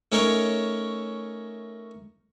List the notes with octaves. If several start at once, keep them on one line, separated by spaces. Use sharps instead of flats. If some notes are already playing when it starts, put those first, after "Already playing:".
A3 C#4 D#4 A#4 C#5